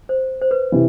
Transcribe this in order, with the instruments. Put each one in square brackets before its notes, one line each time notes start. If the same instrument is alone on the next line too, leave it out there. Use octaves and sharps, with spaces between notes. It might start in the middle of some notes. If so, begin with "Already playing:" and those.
[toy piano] C5
C5
B4
[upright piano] C3 E3